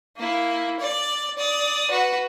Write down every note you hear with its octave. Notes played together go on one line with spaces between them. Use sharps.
A#3 E4
D5
D5 D#6
F#4 B4